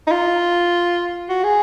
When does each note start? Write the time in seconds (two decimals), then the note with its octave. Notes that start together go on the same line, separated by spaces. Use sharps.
0.07 D#4
0.11 F4
1.29 F#4
1.44 G#4